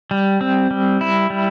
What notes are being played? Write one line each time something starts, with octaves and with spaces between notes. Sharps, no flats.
G3
C4
G3
E4
G3